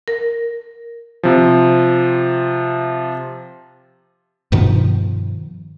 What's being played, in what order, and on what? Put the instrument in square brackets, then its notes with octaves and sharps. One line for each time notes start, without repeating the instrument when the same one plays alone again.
[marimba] A#4
[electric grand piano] C3 F3
[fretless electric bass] G2 B2 D#3 F3